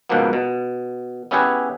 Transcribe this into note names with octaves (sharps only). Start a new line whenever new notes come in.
C#2 G#2 B2 F3 A#3 B3
B2
B3 C#4 E4 G4 G#4 B4